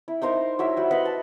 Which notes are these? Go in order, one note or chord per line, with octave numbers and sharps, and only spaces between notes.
E4
D#4 A#4 C5 F5
F#3 E4 A#4 E5
G3 F#4
B4 D#5 F#5 C6
A5